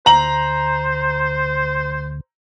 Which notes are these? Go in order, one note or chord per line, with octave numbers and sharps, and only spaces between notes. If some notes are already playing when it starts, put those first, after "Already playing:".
D2 C5 A#5 F#7